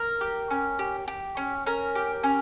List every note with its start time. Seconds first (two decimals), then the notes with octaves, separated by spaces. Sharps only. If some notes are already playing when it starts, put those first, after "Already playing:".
Already playing: A#4
0.21 G4
0.50 C#4
0.79 G4
1.08 G4
1.37 C#4
1.66 C#4 A#4
1.95 G4
2.23 C#4